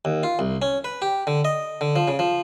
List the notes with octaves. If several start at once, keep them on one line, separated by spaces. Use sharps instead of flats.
D#2
F4
C2
C#4
B4
G4
D3
D#5
D3
F3
C#3
F3